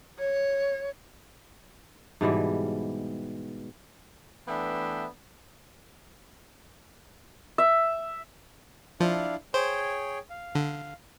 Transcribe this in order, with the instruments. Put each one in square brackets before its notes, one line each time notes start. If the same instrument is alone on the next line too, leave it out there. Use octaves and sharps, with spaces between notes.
[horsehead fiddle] C#5
[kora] G#2 B2 E3 G3
[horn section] E3 A3 B3 D4 E5 G5
[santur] E5
[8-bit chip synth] F3 [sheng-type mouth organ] D4 E4 F5
[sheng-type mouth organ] G#4 C#5 G5 [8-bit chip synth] C5
[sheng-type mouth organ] F5
[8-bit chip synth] D3